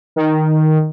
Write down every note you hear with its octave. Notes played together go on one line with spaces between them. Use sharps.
D#3